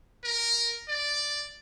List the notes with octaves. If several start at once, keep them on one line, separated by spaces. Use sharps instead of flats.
A#4
D5